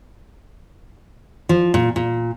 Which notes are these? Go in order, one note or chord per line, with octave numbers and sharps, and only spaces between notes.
F3
A#2
A#2